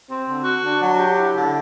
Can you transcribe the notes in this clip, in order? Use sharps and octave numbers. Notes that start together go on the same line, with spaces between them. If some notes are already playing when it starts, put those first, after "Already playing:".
C4
D3
F#4
D4
F#3
G4
E4
D3